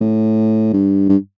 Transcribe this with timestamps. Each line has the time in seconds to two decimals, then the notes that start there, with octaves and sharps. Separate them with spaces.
0.01 A2
0.73 G2
1.09 G2